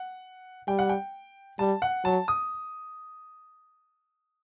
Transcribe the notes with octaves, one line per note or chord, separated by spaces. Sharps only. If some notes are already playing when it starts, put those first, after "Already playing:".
Already playing: F#5
G3 G5
F#5
G5
G3 A5
F#5
F#3 A5
D#6